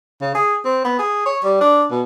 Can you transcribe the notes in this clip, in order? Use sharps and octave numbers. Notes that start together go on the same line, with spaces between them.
C#3
G#4
C4
B3
G#4
C#5
G3
D4
B2